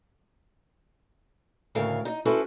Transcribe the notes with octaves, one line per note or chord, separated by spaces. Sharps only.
D2 A2 C#3 A#4 F5
D#4 D#5
C#4 E4 F#4 A4 B4 C5